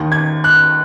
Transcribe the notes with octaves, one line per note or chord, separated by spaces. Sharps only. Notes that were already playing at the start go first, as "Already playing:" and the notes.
Already playing: D#2 D#3
G#6
F#6